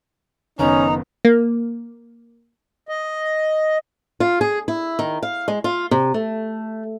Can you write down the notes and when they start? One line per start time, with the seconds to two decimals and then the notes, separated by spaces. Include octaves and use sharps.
0.59 F#1 D#3 B3 C#4 D#4 A#5
1.25 A#3
2.89 D#5
4.20 F4
4.41 G#4
4.68 E4
4.99 D#3
5.23 F5
5.48 G#3
5.64 F4
5.91 C3
6.14 A3